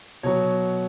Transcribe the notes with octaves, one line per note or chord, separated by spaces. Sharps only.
B2 F#3 C#5